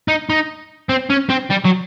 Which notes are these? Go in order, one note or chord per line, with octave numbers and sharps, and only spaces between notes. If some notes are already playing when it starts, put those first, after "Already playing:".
D#4
D#4
C4
C#4
C4
G3
F#3